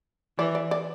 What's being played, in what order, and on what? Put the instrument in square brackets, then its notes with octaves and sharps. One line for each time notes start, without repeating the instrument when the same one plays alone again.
[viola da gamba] E3 [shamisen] D5
[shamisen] D5
D5